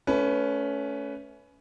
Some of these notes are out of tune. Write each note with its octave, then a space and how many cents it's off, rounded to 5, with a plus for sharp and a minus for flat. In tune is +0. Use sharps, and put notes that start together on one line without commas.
A3 -5 C#4 +20 B4 +10